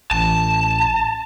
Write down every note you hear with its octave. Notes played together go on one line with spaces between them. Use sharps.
A1 A5